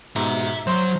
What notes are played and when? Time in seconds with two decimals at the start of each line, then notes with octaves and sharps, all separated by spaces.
0.16 G#2 B2 E5 A#5
0.67 F#3 C5 C6